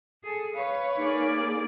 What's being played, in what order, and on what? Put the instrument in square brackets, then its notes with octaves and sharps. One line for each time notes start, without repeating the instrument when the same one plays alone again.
[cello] G#4 A4
[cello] B4 C#5 [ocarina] F5
[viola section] A#3 G#4 D5 [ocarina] D#4